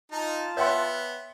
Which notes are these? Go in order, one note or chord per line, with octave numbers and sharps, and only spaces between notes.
D#4 F4 A5 A#5
B3 C#5 E5 F#5 G5 C6 E6